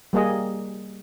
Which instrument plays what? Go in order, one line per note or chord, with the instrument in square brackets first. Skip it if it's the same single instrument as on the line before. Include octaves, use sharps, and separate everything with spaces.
[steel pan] G3 A#3 G#4 D#5